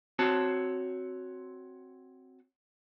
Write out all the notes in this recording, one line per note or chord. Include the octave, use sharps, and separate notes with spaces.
C4 F#4 C#5 A5